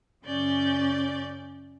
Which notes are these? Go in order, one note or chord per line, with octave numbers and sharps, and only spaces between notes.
F#2 C#3 C#4 D5 G6 A6